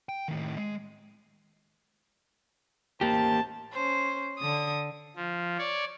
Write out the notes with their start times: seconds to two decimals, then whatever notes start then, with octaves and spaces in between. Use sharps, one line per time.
0.09 G5
0.28 A2 D#3
0.58 G#3
3.01 A1 A#3 G4 C5 A5
3.72 C#4 C5
4.38 D3 D#6
5.16 F3
5.58 C#5 D5